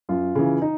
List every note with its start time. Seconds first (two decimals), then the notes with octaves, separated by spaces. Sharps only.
0.09 F#2 F4
0.35 C#3 E3
0.62 D#4